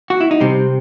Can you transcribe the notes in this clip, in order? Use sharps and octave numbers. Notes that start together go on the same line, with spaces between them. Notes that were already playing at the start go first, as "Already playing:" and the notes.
F#4
E4
D#4
C3 G3 C4